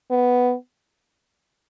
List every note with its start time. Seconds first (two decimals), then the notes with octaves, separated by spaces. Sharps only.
0.11 B3